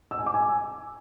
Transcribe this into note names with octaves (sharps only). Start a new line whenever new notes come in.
E6
G#5
D6
G#5